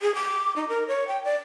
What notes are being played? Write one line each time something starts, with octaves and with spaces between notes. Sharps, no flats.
G#4
D6
D#4
A#4
C#5
G5
D5